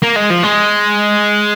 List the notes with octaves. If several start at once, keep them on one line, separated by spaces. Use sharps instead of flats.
A#3
G#3
F3
G#3